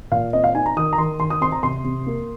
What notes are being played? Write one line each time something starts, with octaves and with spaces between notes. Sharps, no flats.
A#2 F5
C4 D#5
F5
D#4 G#5
A#5
D#3 D#6
A#5
D#3 C6
D#3 C6
D#6
C4 C6
A#5
C3 C6
C3
A#3